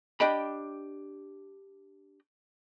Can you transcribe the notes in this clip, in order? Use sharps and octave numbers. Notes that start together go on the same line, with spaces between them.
D4 G4 D#5 G5 B5